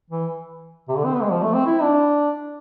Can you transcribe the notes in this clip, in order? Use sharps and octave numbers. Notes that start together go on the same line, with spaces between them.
E3
C3
D3
C4
B3
G#3
F3
A3
C4
E4
D4